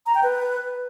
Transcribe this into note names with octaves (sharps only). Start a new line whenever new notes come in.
A#5
G5
B4